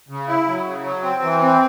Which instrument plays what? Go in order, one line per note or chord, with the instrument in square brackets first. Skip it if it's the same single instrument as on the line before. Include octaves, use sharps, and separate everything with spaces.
[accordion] C#3
E4
F#3
C#3
F#3
C4
E3
C4